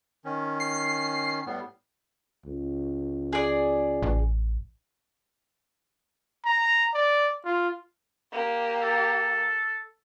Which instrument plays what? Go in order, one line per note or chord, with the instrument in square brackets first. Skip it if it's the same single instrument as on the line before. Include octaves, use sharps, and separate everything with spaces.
[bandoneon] D#3 C#4
[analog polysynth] C7
[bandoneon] A2 G3 B3
[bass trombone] C#2
[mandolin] G#4 D5
[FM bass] A1
[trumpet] A#5
D5
F4
[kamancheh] A#3 G4
[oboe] A4